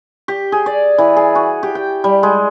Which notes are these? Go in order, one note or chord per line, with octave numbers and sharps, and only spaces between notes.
G4
G#4
D5
E3
G#4
F#4
G4
G5
G3
G#3